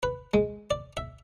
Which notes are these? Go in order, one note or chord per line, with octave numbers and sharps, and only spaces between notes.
B4
G#3
D5
E5